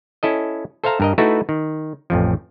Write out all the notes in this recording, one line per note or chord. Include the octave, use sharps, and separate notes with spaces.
C#4 E4 A4 D#5
A4 C5 E5 F5 A#5
G2 A#4 D#5
A3 D#4 E4 F#4 A4 B4
D#3
A1 F2 F3